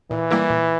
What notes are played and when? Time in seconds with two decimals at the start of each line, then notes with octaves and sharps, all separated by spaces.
0.11 A#2 E3
0.31 G3 A#3 E4 A#4
0.50 A#2